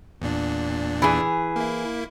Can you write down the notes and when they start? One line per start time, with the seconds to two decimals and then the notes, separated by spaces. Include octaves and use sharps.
0.21 E2 A#2 D4
1.02 E3 G#4
1.56 A#3 E4